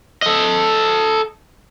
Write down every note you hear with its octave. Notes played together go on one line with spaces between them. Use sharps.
A4 D#5